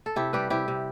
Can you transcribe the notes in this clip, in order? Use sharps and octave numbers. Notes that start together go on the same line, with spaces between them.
A4
C3 E4 G4
G3 G4 B4
C3 E4 G4
C3